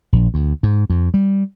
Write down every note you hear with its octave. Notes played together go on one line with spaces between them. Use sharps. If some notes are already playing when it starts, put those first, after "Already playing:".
A#1
D2
G#2
F2
G3